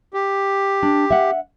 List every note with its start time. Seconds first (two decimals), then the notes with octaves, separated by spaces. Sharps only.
0.14 G4
0.83 D4
1.11 E5 F#5